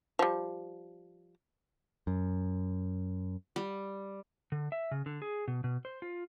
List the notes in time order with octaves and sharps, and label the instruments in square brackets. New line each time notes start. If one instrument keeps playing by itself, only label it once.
[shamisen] F3 G3
[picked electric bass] F#2
[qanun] G3
[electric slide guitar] D3
E5
C#3
D3
G#4
B2
B2
C5
F4